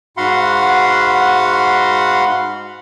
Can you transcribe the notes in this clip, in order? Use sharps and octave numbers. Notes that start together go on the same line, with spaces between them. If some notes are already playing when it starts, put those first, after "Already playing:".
G#2 F#4 F5 F#5 B5 C6